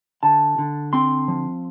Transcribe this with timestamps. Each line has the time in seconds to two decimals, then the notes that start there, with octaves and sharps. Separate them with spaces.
0.23 D3 A5
0.58 D3
0.93 C4 C6
1.28 F3